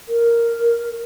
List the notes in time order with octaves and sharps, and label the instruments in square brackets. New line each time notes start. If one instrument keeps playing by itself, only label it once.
[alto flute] A#4